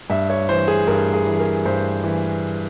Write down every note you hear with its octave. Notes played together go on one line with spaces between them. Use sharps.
G2 E5
C#5
E3 C5
G#4
G2 A#4
G#4
E3
A#4
G2 C5
E3